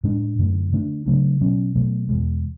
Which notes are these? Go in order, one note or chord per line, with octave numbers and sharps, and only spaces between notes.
A2 G#3 D4
F#2 D3 A3
D3 A3 D4
C#3 F#3 A3 D4
B2 F#3 C#4
B2 F#3 A3
E2 B2 G#3